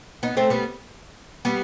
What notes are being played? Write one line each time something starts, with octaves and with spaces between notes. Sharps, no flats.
B3 D#4
A3 C4
G3 B3
G3 B3